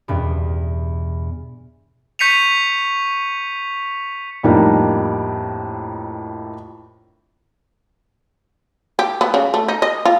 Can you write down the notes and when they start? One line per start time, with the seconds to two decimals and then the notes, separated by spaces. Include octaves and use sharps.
0.08 E2 G2 B2
2.19 C#6 G6 B6 C#7 D#7 F7
4.43 F2 A2 G3 A#3 D4 D#4
8.99 G4
9.21 B3
9.34 C#3
9.54 A3
9.68 D#4
9.82 D#5
10.05 F4